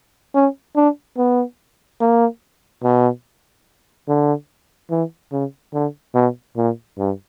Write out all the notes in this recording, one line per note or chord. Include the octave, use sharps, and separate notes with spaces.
C#4
D4
B3
A#3
B2
D3
E3
C#3
D3
B2
A#2
G2